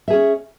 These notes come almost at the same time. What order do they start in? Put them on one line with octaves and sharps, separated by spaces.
E5 G#4 C#4